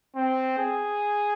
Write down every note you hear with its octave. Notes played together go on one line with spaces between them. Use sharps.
C4
G#4